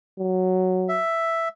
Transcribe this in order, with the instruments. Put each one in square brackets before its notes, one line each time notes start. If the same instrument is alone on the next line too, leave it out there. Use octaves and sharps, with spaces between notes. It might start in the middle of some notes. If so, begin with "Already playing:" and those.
[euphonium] F#3
[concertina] E5